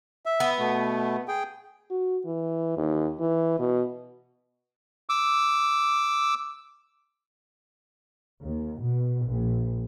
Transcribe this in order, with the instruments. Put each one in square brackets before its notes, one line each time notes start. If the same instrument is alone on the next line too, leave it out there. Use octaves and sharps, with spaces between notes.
[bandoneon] E5
[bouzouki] B3
[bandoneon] B2 A3
G#4 G5
[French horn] F#4
E3
D#2
E3
B2
[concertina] D6 E6
[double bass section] D#2
B2
A#1